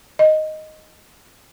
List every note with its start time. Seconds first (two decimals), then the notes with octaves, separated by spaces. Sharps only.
0.19 D#5